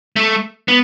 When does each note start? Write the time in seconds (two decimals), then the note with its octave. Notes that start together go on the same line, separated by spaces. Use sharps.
0.16 A3
0.68 B3